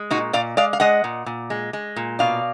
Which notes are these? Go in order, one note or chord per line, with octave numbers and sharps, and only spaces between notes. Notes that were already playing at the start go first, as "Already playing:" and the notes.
Already playing: G#3
A#2 D#4 F#4
A#2 D5 F5
G#3 D5 F5
F5
G#3 D#5 F#5
A#2
A#2
G#3
G#3
A#2
B2 D5 F5